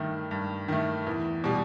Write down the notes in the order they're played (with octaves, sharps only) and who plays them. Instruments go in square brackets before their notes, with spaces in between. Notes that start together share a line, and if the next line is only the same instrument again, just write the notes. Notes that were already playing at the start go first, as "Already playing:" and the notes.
Already playing: [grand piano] G2 D#3 A3
G2
D#3 A3
E2
B2 G3